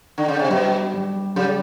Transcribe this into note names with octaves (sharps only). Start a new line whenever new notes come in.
D3
C#3
C3
B2 G3
G3
C#3 G3